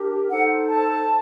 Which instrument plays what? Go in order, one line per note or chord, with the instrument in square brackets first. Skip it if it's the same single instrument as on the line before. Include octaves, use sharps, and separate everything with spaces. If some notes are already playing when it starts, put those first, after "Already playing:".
Already playing: [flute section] D4 G4 A#4
D#4 A4 C5 F#5
A5